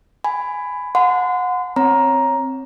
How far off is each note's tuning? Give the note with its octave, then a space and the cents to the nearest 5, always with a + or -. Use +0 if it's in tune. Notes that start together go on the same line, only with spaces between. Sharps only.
G#5 +0 B5 +15
F#5 -25 A5 +0 C6 -40
C4 +10 C#5 +0 A#5 +10